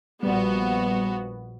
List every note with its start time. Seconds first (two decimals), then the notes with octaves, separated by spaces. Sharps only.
0.23 A#1 G3 B3 F#4